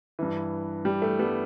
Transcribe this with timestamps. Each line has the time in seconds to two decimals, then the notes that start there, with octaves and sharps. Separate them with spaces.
0.19 G2 E3
0.85 G3
1.02 A3
1.19 G3 B3